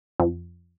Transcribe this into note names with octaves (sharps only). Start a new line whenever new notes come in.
F2